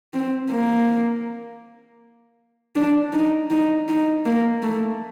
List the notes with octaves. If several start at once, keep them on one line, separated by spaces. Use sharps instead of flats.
C4
A#3
D4
D#4
D#4
D#4
A#3
A3